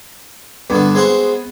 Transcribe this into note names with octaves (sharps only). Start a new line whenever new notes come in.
G2 D3 B3
G#3 C4 F#4